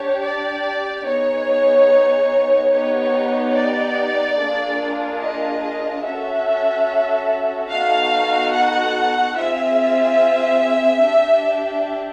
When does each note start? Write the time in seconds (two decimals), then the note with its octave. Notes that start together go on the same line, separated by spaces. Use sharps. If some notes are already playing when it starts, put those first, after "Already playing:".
Already playing: D4 G4 C#5
0.23 D5
1.05 B3 D#4 G#4 C#5
2.72 B3 D#4 G4 C#5
3.55 D5
4.38 A#3 D4 F4 G#4
5.21 D#5
6.04 C#4 F#4 A4 E5
7.70 B3 D#4 F#4 A4 F5
8.52 F#5
9.36 C4 F4 G#4 E5
11.02 D4 G4